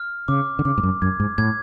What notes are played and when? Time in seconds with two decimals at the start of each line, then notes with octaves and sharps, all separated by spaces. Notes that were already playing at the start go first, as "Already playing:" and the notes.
Already playing: F6
0.28 C#3 D6
0.59 D3
0.65 C#3 D6
0.78 G#2
0.83 F#2
1.02 F#2 G#6
1.20 G#2
1.38 A2 G#6